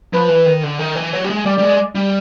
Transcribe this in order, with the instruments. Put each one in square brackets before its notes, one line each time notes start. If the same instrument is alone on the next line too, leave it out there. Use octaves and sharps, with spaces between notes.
[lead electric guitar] F3 [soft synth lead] B4
[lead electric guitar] E3
D#3
D3
D#3
E3
F#3
G3
G#3
[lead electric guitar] G3 [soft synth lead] D5
[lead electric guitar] G3
G#3
G3